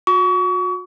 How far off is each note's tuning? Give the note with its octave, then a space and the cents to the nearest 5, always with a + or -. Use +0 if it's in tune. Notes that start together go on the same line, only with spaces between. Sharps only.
F#4 -40 C#6 +35